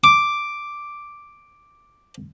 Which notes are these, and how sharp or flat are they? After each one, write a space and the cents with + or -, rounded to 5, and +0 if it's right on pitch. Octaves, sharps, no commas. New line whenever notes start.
D6 +0